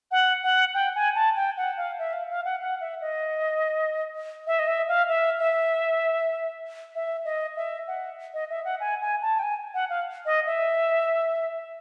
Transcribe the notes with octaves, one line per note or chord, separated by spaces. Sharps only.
F#5
F#5
G5
G#5
A5
G5
F#5
F5
E5
F5
F5
F#5
F#5
E5
D#5
E5
D#5
E5
F5
E5
E5
E5
D#5
E5
F#5
D#5
E5
F#5
G#5
G#5
A5
G5
G#5
F#5
F5
D#5
E5